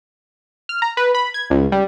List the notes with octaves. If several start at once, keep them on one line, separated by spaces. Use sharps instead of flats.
F6
A#5
B4
B5
G#6
C#2
G3